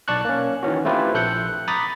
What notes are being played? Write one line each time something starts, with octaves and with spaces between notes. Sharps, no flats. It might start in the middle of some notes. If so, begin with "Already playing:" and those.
B1 D5 A5 C#6 F#6
A#3 C#4
D#3 E3 C#4 F#4
A3 C4 E4 F4 G4 B4
A#1 A4 F#6 G6 C#7
A#5 B5 D6 D#6 A6 B6